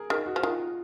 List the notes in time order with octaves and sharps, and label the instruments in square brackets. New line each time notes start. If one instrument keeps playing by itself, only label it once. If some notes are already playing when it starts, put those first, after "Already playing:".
Already playing: [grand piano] G#4 A#4
[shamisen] D#3 [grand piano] G#4
[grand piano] F#4
[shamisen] F3
[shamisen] D#3 [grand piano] F4